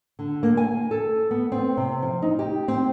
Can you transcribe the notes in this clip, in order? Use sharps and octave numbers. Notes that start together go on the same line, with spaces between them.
D3
A#3
G#5
A4
B3
C4
C3
F3
D#4
G4
C4